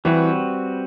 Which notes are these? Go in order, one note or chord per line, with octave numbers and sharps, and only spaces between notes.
E3 G3 C4 F#4 B4